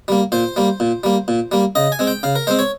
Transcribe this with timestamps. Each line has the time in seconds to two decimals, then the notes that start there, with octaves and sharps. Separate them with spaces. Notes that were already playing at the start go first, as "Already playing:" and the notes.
0.08 G3 A#3
0.32 A#2 C5
0.56 G3 A#3
0.80 A#2
1.04 G3 A#3
1.28 A#2
1.52 G3 A#3
1.75 C#3 D#5
1.92 G#5
1.99 G#3 C4
2.07 G5
2.23 C#3 F5
2.35 A#4
2.47 G#3 C4 C5
2.59 C#5